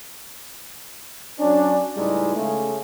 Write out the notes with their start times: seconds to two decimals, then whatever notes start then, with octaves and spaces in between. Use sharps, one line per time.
1.39 F#3 C#4 D4
1.96 C#2 A2 G3 G#3 D#4
2.36 C#3 G#3 A3